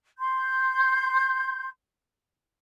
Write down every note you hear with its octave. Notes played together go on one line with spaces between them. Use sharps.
C6 G6